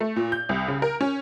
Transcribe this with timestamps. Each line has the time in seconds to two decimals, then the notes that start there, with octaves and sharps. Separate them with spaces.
0.01 A3
0.16 A#2
0.32 G6
0.49 C2
0.68 C#3
0.82 A#4
1.01 C#4